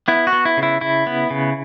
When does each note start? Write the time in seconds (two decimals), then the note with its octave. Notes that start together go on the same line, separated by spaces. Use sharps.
0.08 B3 E4
0.27 F#4
0.33 B3
0.45 E4
0.57 C#3
0.63 E4
0.81 C#3 E4
1.07 B3
1.30 C#3